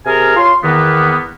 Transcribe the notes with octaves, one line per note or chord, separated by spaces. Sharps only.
C3 G#4 A#4 G#5 F6
F4 C#5 C6
E2 D#3 A#3 B3